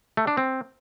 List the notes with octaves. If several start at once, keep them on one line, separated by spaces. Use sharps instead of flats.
A3
D4
C4